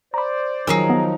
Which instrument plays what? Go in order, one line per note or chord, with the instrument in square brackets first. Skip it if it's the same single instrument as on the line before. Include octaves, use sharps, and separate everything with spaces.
[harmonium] C5 D5 [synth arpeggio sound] A#5 B5
[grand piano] D#3 F#3 [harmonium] F3 D#4 [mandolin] G#4 A#4 E6
[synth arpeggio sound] B3